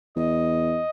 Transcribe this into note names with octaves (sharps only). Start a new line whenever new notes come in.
E2 D#5